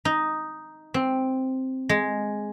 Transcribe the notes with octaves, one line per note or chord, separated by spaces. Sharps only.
D#4
C4
G#3